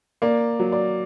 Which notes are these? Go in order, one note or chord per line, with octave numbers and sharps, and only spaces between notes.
A#3 D5
F#3
D5